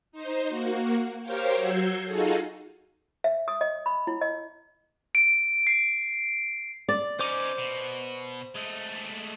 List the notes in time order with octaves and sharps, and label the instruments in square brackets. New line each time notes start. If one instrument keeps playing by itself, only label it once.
[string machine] D#4 C5
A#3 F#4
G4 A#4 C5 C#5 F5 G5
F#3 F#4 E6 G6 G#6 C7
D#4 F4 F#4 G#4 A4
[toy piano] E5
D#6
D#5
B5
E4
D#5
[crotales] D7
C7
[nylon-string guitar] D5
[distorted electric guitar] C#4 D#4 [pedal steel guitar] C5 D6
[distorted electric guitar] B2
G#3 A3